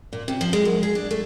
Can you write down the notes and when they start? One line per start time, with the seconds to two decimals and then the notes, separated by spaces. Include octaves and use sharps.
0.13 A#2
0.28 C3
0.41 F3
0.53 G#3
0.65 F#2
0.83 G#4
0.95 D4
1.11 A3